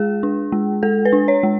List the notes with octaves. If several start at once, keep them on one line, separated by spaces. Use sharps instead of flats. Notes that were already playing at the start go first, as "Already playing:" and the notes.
Already playing: G#3 G#4
D4
G#3
G#3 A4
B4
D4
C#5
G#3